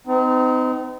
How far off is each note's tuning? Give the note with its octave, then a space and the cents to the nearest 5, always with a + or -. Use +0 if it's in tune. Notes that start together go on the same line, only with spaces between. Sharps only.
C4 -40 D#4 +0